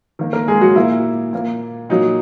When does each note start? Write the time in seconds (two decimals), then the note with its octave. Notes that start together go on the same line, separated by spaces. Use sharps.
0.19 D#3 A#3
0.33 A#3 A#4
0.48 G#3 G#4
0.61 F#3 F#4
0.76 A#2 A#3 E4
1.33 A#2 A#3
1.90 A#2 F#3 A#3 D#4